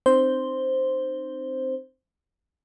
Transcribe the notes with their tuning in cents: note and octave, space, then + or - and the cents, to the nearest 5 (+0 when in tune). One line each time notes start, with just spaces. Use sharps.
C4 +0 D#4 -35 C5 +0